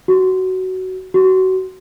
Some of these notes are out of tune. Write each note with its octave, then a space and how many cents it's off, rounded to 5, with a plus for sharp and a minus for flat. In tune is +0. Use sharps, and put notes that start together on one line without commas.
F#4 +15
F#4 +25